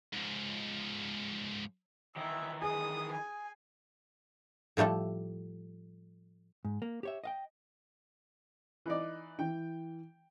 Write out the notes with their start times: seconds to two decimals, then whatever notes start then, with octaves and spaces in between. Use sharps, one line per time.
0.13 G#2 F3
2.17 D#3 E3 E5
2.62 G#4 D#6
3.12 G#5
4.77 A2 F3 G3 A3 A4
6.65 G#2
6.82 A#3
7.03 G4 C#5 E5
7.24 D#5 F5 G5
8.86 E3 D#4 D5
9.39 E3 G5